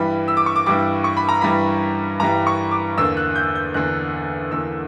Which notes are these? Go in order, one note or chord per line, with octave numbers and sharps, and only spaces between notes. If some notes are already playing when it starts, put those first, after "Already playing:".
Already playing: G2 E3 G3 B5
E6
D6
C#6
D6
G2 E3 G3 D6
C#6
B5
A#5
G2 E3 G3 B5
G2 E3 G3 A#5
C#6
D6
E2 D3 A#3 E6
F#6
G6
G6
E2 D3 A#3 F#6
E2 D3 A#3 E6